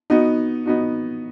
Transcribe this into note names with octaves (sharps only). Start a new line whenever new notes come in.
B3 D#4 F#4
B3 D#4 F#4